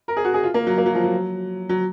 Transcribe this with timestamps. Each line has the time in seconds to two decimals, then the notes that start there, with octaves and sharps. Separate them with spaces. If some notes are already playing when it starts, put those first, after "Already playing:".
0.08 A#4
0.17 G#4
0.25 F#4
0.34 G#4
0.43 F4
0.54 A#3
0.67 F#3
0.78 A#3
0.86 F#3
0.95 F3
1.04 F#3
1.69 F#3